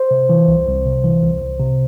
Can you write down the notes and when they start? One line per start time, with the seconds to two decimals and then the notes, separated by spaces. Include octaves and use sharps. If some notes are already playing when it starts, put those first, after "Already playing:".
Already playing: C5
0.11 C3
0.29 E3
0.48 C2
0.67 C2
0.85 C3
1.04 E3
1.23 C2
1.41 C2
1.60 C3